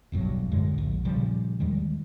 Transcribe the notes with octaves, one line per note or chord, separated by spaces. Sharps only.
D#1 B1 G2 F#3
F#2 A2 D3 G#3
A#1 D#2
A#2 C#3 F3 G3
D#2 D#3 G3 G#3